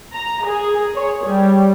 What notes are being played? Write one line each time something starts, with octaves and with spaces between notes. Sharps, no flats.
A#5
G#4
C#5
G3